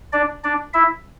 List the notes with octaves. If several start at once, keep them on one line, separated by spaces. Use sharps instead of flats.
D4 D5
D4 D5
E4 E5